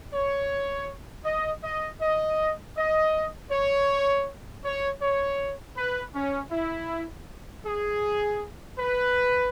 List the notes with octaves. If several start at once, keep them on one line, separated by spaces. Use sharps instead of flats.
C#5
D#5
D#5
D#5
D#5
C#5
C#5
C#5
B4
C#4
E4
G#4
B4